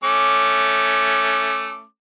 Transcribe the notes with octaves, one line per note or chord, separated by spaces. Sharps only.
A3 C#4 D6